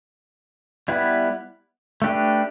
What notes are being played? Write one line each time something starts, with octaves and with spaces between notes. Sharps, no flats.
G3 B3 E4 B4
A3 D4 G4 B4